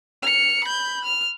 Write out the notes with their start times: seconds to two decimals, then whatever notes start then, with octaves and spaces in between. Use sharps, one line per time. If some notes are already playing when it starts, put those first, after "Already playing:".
0.22 F6 C#7
0.65 B5 G6
1.05 F6